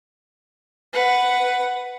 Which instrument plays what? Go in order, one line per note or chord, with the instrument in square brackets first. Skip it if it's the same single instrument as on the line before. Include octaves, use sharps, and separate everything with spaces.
[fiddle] B4 F#5